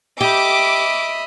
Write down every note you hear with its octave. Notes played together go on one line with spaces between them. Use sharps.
G4 D#5 E5 B5 D6